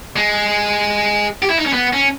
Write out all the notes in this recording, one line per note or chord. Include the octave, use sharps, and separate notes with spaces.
G#3
G4
E4
D#4
C#4
B3
C#4